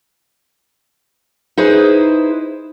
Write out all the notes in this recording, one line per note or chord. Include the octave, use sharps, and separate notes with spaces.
D#4 E4 G#4 B4 C5